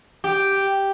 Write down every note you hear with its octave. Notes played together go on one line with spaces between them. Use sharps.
G4